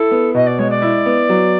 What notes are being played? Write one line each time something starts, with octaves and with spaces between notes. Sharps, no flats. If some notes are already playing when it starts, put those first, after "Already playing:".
Already playing: E4 A4
B3
B2 D#5
D5
G#3 C#5
D5
E4
B3
F#3